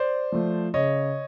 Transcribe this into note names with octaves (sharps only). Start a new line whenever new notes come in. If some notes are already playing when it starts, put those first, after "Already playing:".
Already playing: C5 D5
F3 A3
C#3 C#5 D#5